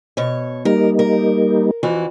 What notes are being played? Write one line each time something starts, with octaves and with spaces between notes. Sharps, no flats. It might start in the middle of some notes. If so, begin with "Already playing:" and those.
B2 C#5
G3 A#3 D#4 A#4
A#4
F2 E3 F#4